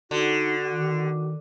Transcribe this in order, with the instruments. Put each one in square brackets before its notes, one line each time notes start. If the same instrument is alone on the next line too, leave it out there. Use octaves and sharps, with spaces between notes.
[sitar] D3 [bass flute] D#4 [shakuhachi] F#4
[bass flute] D#3